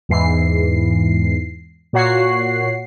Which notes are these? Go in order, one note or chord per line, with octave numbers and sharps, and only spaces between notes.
E2 G#2 E3 C7
A#2 F#4 C#5 F#5 C7